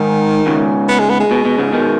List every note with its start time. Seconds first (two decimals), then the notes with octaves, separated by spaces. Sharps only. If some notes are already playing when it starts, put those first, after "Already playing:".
Already playing: G#2 D#3
0.46 G#2 C#3
0.89 B3
0.99 G#3
1.10 B3
1.20 G#3
1.31 B2
1.45 B2
1.58 G#2 C#3
1.73 B2 D#3